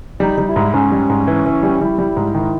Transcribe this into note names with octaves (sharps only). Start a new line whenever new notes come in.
G3 D#4
G3
E4
G#2
G#2 C#4
G3
G#2
E3
E3
G3
G3 E4
G3
G#2
D#3 E4